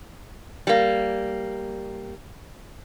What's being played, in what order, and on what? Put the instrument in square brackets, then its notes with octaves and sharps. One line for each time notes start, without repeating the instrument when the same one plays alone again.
[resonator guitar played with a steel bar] G3 A#3